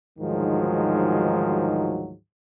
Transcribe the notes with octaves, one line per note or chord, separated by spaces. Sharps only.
D2 G#2 D#3 F3 F#3 G#3